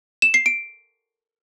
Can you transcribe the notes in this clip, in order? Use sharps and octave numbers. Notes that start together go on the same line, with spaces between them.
E7
C7
D7